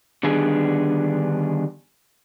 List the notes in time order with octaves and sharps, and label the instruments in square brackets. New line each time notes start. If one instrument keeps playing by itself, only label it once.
[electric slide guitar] D3 D#3 G3 B3 D4 G#4